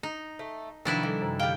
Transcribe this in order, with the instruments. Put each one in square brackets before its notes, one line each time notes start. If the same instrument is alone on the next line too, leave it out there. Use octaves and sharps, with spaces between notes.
[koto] D#4
[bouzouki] A3
[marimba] C3 F3 [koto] D#3 D4 E4 [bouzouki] F#3 B4
[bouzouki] E3 [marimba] G3 A4
[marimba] F#2 C3
[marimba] D3 [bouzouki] G3 F5 [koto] G5